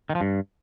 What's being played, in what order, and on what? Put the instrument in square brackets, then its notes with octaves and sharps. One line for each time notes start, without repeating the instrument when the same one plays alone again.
[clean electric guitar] D#3
F3
G2